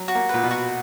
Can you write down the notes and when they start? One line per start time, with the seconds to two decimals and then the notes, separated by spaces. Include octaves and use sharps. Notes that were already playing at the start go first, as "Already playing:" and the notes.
Already playing: F#3
0.08 F#4
0.15 A#3
0.29 A#2 B4
0.44 B2
0.51 F#4